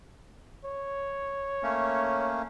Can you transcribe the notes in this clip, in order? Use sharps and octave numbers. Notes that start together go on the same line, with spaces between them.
C#5
A3 A#3 C#4